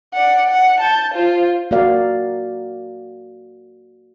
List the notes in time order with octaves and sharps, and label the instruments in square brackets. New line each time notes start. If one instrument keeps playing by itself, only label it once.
[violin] D5 F#5
F#5
A5 G6
F4 C5
[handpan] A#3 F#4 A#4 D5 F5